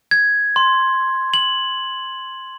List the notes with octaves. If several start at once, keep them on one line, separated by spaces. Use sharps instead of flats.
G#6
C6
F#7